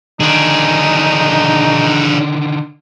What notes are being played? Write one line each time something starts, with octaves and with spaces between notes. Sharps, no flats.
D3 D#3 D4 D#4 G#4